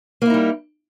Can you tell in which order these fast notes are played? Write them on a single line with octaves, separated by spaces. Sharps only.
A#3 E4 D#4 G3